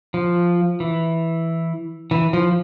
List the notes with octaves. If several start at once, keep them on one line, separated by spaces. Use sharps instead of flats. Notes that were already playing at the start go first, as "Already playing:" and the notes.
F3
E3
E3
F3